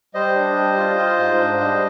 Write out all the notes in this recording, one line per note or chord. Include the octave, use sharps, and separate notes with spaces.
G3 C5 D#5
D4
G3
F4
F4
G#2
D4
G3